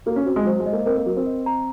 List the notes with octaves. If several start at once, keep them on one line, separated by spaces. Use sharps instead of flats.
A#3 F#4
C#4
C4 F#4
G#3
F#3 C5
G#3
D#5
A#3
C4 A#4
A#3
F#3 A#4
C4
D#5
A#5